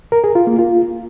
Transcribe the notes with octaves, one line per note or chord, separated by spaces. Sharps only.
A#4
G#4
F4
A#3
F4